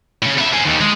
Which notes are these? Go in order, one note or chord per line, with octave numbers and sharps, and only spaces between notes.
A2 C#3
B3 E5
C5 G#5
D#2 D#3
G#3